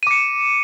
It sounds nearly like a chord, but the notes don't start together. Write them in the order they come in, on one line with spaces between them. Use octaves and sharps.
D#7 D6 C#7